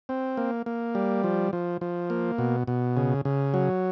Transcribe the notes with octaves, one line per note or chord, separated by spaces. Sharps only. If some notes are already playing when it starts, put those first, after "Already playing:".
C4
A#3
A#3
G3
F3
F3
F3
A#3
B2
B2
C#3
C#3
F#3